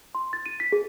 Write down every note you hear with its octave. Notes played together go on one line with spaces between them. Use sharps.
C6
A6
D#7
B6
G#4